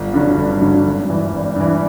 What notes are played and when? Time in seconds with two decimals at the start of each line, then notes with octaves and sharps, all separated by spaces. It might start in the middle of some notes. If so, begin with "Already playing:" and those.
Already playing: G1
0.14 G2 D3 F#3
0.38 G1
0.61 G2 D3 F#3
0.86 G#1
1.09 G2 E3
1.33 G#1
1.56 G2 E3